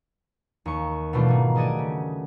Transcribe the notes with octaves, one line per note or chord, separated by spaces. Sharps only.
D#2 C#6
B2 E3 F#3 A3 D4 F4
G#2 D#3
A3 G#4 D5 D#5 F#5 G#5
C#3